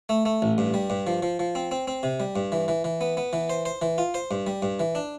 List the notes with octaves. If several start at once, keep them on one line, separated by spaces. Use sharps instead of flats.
A3
A3
A1
G2
G3
G2
F3
F3
F3
C4
C4
C4
C3
G3
G2
E3
E3
E3
B3
B3
E3
C5
C5
E3
F4
C5
G2
G3
G2
E3
D4